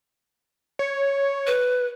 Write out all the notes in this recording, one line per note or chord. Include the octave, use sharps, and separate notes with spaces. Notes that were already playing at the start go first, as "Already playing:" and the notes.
C#5
B4